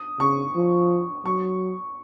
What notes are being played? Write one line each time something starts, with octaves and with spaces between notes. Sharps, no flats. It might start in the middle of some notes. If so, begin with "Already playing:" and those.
Already playing: D#6
C#3 C#6
F3
F#3 C#6